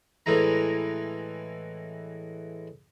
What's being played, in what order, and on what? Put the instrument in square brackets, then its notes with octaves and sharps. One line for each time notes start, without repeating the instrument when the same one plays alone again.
[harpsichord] A2 E3 G#3 A#5